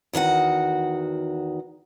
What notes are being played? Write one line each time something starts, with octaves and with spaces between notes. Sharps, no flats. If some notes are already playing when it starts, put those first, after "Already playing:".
E2 D#3 F#4 F#5